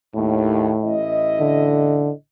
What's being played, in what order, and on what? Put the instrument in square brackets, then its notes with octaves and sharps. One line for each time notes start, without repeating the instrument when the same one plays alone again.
[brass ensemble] D#2 [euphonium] A2
[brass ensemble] A1 E4 D#5
[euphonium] D3